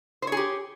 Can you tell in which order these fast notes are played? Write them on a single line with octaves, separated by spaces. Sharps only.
C5 C#5 G#4 G4